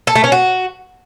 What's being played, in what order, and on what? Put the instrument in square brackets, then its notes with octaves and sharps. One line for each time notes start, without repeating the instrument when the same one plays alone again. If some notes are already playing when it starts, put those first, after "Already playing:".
[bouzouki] A4
A3
C#4
F#4